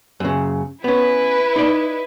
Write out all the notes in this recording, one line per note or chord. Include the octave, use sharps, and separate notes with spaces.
F#2 C#3
B3 C#4 E4 B4
D#4 D5